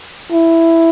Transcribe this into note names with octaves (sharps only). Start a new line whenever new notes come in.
E4